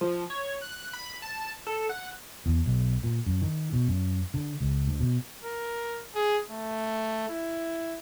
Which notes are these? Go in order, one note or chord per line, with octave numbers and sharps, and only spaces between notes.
F3
C#5
F#6
B5
A5
A4
F#5
E2
B1
A#2
F#2
D#3
B2
F#2
D3
C#2
D2
B2
A#4
G#4
A3
E4